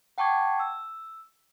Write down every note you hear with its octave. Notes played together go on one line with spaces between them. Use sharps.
F#5 G5 A5 C#6 D6 G#6
E6